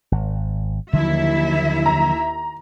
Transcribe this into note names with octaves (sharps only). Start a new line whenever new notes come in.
G#1
D#2 D3 F3 F#3 E4 E5
A#5